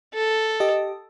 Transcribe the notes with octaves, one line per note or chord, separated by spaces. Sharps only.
A4
G4 D#5